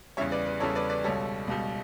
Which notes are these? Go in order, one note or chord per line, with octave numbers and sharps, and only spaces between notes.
E2 C#3 G3 C#5 E5
B4 D5
B4
E2 C#3 G3 A4 C#5
B4 D5
B4 D5
C#2 B2 G3 A4 C#5
C#2 B2 G3